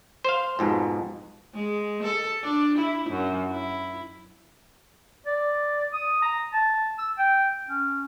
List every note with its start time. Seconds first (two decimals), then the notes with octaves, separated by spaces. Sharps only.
0.25 C5 F5
0.59 F2 G#2 B2
1.54 G#3
2.04 A4
2.43 D4
2.78 E4
3.10 F#2
3.51 E4
5.27 D5
5.93 D#6
6.22 A#5
6.53 A5
6.98 E6
7.19 G5
7.68 C#4